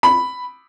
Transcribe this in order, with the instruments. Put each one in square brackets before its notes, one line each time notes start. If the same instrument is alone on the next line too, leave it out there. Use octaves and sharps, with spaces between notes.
[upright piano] B5